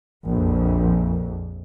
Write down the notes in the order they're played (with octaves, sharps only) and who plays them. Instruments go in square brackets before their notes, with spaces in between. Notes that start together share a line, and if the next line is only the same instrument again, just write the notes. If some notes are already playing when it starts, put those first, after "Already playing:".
[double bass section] A#1 F2